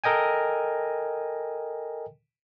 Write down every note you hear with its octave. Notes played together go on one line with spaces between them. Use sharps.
A4 A#4 D#5 G5 G#5